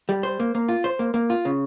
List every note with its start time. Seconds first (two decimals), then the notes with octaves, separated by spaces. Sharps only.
0.09 G3
0.23 C5
0.40 A#3
0.55 A#3
0.69 F4
0.84 C5
0.99 A#3
1.14 A#3
1.30 F4
1.45 C#3